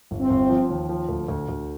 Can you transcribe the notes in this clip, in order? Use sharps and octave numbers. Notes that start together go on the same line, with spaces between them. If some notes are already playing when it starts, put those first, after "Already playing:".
G1
C4
G1
F3
D#2
F3
D2
D2
D2